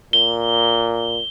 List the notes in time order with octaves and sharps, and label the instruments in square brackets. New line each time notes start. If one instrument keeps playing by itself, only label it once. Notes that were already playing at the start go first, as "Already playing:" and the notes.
[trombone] A#2 [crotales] G7